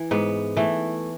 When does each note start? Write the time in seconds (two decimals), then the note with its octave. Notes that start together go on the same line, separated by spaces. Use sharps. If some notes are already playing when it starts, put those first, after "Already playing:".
Already playing: E3
0.11 G#2 B3
0.57 E3 A3